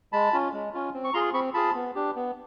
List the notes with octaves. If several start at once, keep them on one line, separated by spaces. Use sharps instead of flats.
G#3 A5 B5
C#4 F4
G#3
C#4 F4
C4
C#6
F4 G#4 A#5 C6
C4 B5 C#6
F4 G#4 A5 B5
B3
D4 G4
B3